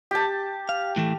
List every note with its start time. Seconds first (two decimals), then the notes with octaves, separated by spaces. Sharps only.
0.11 G4 A5
0.69 F5
0.96 A2 E3 A3